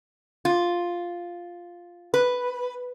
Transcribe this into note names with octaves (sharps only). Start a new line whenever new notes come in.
F4
B4